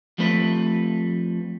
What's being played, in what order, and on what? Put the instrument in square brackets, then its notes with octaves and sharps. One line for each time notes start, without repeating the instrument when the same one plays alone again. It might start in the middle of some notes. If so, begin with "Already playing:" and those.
[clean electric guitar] F3 G3 A3 C4 B4